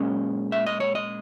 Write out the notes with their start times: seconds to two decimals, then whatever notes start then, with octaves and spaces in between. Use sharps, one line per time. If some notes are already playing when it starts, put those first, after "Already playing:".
Already playing: A#2 G#3 C#4 D#5
0.52 E5
0.66 D#5
0.80 C#5
0.95 D#5